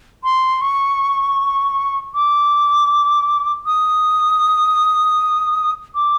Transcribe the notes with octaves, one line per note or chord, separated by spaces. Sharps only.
C6
C#6
D6
D#6
D6